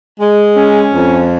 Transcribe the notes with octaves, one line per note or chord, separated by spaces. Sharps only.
G#3
C#4
F2